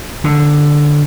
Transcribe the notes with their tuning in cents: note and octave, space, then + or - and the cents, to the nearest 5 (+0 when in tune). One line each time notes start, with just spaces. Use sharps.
D3 +5